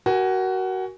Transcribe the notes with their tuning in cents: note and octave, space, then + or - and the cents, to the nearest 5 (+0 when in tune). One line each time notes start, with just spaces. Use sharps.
F#4 +20 A#4 +15 G#5 -10